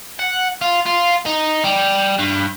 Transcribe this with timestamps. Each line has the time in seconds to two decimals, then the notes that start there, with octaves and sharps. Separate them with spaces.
0.19 F#5
0.61 F4
0.86 F4
1.26 D#4
1.64 G3
2.19 G2